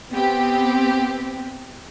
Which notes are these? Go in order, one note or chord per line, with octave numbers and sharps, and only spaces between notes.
B3 C4 G4